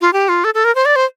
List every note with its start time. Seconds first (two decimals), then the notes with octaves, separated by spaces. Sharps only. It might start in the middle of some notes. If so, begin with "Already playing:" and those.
0.01 F4
0.13 G4
0.29 F4
0.44 A4
0.54 A4
0.64 A#4
0.75 C5
0.85 D5
0.96 C5